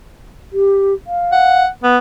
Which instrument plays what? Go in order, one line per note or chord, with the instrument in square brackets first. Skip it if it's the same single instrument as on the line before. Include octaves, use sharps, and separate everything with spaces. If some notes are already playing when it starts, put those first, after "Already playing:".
[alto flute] G4
F5
[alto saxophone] F#5
B3